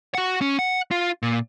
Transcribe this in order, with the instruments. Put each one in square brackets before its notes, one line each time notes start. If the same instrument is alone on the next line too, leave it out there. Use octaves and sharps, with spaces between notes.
[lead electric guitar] F#4 F#5
C#4
F#5
F4
A#2